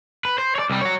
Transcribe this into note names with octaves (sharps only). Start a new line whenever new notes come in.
B4
C5
C#5 D5
C2 G3
F#4 C#5